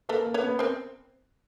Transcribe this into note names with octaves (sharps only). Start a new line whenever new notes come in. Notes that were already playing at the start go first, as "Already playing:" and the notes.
A#3 A4 B4
A#3
B4 C#5
B3
C4 A#4 C5